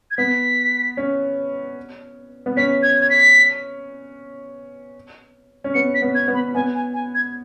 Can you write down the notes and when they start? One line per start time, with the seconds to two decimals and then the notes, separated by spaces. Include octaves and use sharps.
0.11 G#6
0.18 B3 B6
0.97 C#4
2.46 B3
2.57 C#4 B6
2.83 G#6
3.01 G#6
3.10 B6
5.64 C#4
5.74 B3 C#7
5.94 B6
6.02 B3
6.15 G#6
6.28 B3
6.34 B5
6.55 B3 G#5
6.75 G#5
6.94 G#5
7.15 G#6